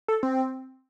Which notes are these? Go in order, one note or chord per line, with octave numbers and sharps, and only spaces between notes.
A4
C4